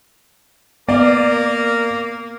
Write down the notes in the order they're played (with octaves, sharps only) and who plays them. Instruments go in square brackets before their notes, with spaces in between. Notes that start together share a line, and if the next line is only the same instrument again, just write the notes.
[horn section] A#3 [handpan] B3 [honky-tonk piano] D5